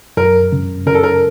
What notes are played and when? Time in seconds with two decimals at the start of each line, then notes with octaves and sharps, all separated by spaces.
0.17 F#2 A#4
0.52 C#3
0.87 C#3 A#4
0.95 A4
1.04 A#4